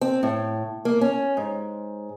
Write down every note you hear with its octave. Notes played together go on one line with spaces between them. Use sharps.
C4
A2
A#3
C#4
G#2